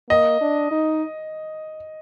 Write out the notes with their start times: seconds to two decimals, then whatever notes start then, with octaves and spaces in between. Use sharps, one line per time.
0.10 A#3 D#5
0.41 D4
0.71 D#4